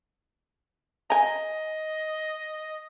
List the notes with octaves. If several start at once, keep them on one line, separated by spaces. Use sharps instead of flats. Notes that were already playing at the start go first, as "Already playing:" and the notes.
D#5 G#5 A#5